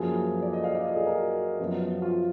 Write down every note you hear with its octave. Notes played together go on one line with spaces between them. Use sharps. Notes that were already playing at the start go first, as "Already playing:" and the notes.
Already playing: F#2 F3 A#3 G#4
D5
D#5
F5
D5
D#5
G#4
A#4
F#4
F#2 F3 B3
F4